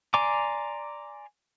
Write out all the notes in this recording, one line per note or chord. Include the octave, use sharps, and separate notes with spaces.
D5 G#5 A#5 C6 D6